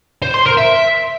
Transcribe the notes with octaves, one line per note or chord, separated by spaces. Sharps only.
C5
C6
A#4
E5